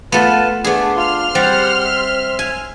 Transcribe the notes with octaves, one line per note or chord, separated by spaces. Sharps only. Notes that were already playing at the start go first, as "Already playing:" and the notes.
A3 B3 F4 B4 A5
A3 B3 D4 G#4
F4 C6 F6
G3 C4 G4 C5 F#5
E5
G#5